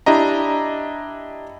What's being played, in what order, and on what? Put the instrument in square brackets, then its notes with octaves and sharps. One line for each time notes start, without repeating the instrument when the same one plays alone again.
[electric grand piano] D4 E4 G4 D#5 A#5